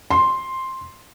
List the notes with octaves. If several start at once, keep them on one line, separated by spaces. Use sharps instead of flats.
C6